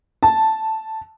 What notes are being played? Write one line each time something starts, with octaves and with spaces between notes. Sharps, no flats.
A5